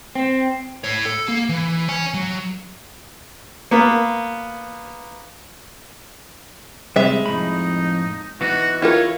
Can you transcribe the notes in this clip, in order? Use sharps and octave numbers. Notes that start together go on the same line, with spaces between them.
C4
A2 C#5
A4
A#3
E3
C#5 G#5
F#3
A#3 B3
C3 G3 G#3 E5
F2 A2 D#4 B5
E3 B3 D#4 F#4
E4 F4 A#4 C#5